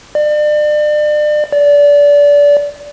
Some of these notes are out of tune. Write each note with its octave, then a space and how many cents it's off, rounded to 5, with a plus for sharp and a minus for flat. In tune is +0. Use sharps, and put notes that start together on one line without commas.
D5 +35
D5 -25